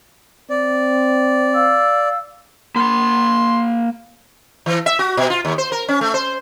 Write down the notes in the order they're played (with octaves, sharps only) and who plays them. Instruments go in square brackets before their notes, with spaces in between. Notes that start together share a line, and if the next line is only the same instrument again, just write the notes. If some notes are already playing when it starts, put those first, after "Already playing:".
[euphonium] C4 [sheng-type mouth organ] D5
[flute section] F5 E6
[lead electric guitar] A#3 B5 [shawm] C6
[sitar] E3
E5
F#4
B2
F4
D#2
C5
A#4
C#4
A3
C5